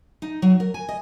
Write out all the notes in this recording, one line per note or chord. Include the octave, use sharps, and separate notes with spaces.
D#4
F#3
A#4
G#5
D#5